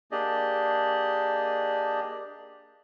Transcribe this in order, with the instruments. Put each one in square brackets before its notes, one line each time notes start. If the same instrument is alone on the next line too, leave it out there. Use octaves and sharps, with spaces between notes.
[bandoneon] A#3 D4 G4 G#4 D5 D#5